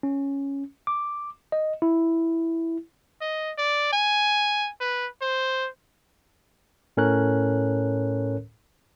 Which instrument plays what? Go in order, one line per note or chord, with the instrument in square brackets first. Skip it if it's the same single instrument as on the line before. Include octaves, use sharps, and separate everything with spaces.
[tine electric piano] C#4
D6
D#5
E4
[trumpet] D#5
D5
G#5
B4
C5
[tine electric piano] A2 C#4 A4 A#4 C#5 F#6